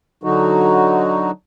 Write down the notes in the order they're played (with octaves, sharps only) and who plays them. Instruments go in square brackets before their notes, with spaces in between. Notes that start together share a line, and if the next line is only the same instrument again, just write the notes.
[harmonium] D3 F#3 D#4 F#4